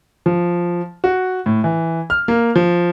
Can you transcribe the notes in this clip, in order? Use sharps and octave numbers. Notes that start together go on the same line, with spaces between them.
F3
F#4
A2
E3
F6
A#3
F3